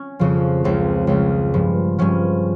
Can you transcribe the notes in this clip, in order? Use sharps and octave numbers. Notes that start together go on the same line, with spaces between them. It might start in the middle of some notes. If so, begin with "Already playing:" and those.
Already playing: C#4
F2 C#3 F3
C#2 C#3 F3 C4
C#2 C#3 F3
G2 F3
G2 F3 C#4